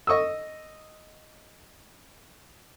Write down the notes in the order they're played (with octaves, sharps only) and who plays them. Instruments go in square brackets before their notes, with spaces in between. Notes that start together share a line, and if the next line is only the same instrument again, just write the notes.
[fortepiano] D#5 C#6 D#6 E6